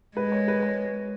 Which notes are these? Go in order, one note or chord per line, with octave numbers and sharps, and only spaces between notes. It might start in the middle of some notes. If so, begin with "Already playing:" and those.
G#3 B4
C#5
B4
C#5